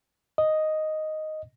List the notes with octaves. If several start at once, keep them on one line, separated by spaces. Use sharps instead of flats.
D#5